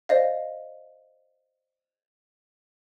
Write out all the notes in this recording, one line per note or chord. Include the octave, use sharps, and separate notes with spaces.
C5 D5 D#5 F5